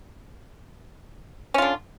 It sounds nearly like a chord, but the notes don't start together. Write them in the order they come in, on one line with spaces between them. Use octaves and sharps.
C#4 F4 D3